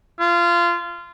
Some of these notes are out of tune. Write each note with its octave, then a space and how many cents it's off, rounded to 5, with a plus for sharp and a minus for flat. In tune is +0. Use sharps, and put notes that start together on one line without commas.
F4 -20